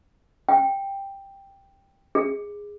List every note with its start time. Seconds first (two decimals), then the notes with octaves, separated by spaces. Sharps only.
0.49 G5
2.15 G#4